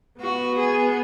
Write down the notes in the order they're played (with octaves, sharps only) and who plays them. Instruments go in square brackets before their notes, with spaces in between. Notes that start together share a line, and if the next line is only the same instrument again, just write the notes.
[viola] B3 [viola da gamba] F#4
[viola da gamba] G#4